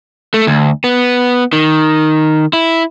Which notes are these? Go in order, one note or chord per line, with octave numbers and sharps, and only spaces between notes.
A3
D2
B3
D#3
E4